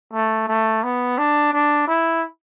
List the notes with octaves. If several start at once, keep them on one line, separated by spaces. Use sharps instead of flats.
A3
A3
B3
D4
D4
E4